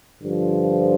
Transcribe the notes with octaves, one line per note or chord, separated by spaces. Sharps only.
G2 D3 F3